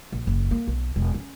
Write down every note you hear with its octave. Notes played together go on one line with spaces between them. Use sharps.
A#1
F#1
A#3
B1
E1
C#4